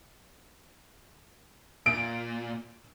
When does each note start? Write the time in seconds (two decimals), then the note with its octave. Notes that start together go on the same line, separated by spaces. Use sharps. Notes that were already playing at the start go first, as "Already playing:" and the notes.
1.86 A#2 D7